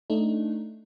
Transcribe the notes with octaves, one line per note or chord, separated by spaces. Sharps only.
A3 D4 D#4